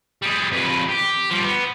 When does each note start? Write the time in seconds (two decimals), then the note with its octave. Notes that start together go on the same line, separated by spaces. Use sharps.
0.22 G3 G#4
0.52 F2 B4
0.88 G4
1.31 F3 G3
1.43 B3